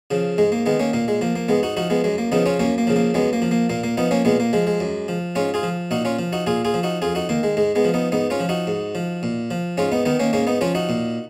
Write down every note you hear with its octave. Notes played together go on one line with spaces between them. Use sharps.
C#3 F3
G#2 G#3
A#3
D#3 G#3 B3
A#3 C#4
A#2 A#3
G#3
F3 A#3
A#3
G#2 G#3 B3
D#4 F#4
F3 D#4 F#4
G#3 B3
F#2 G#3
A#3
C#3 F3 B3 D#4
C#4 F4
F#2 A#3 C#4
A#3
C#3 F3
A#3
F#2 G#3 B3
A#3
F3
A#3
A#2 A#3
A#3
F3 B3 D#4
A#3 C#4
A#2 G#3 B3
A#3
F3 G#3
G#3
F#2
F3
G#2 C#4 F4
F4 G#4
F3
A#2 D#4 F#4
C#4 F4
F3
D#4 F#4
A#2 F4 G#4
F4 G#4
F3
D#4 F#4
F2 F4 G#4
D#4 F#4
D#3 A#3
G#3
G#2 G#3
G#3 B3
F3
B3 D#4
G#2 B3 D#4
C#4 F4
F3
D#4 F#4
G#2
F3
A#2
F3
G#2 C#4 F4
B3 D#4
D#3 B3 D#4
A#3 C#4
G#2 A#3 C#4
B3 D#4
F3 C#4 F4
D#4 F#4
A#2